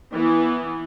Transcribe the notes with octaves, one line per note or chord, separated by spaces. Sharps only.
E3 B3